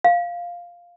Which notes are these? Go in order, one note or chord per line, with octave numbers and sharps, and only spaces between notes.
F5